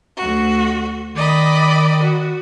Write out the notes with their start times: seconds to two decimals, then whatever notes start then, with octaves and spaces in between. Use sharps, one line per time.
0.17 D2 F#4
1.15 D#3 D5 D#5 B5
2.03 F#4